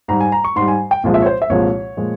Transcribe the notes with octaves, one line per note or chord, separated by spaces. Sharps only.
G#2 G3 A#5
G#5
A#5
C#6
G#2 G3 C6
G#5
G5
C2 A#2 F3 G#3
E5
C#5
C5
E5
C2 A#2 F3 G#3 C#5
A#2 F3 G#3